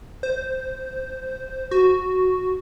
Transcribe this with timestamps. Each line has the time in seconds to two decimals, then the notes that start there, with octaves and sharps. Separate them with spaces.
0.23 C5
1.71 F#4